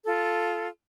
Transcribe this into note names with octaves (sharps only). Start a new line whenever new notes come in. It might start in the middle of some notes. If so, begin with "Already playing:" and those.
F4 A4